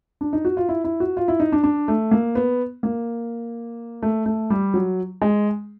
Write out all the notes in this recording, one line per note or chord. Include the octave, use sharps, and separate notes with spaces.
D4
D#4
F#4
F4
E4
E4
F#4
F4
E4
D#4
D4
D4
A3
A#3
B3
A#3
A3
A3
G3
F#3
G#3